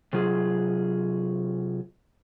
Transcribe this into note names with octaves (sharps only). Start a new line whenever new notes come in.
C3 F#3 F4 G#4